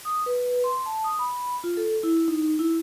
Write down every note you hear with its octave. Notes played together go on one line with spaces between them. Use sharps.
D#6
B4
C6
A5
D#6
B5
F4
A4
E4
D#4
E4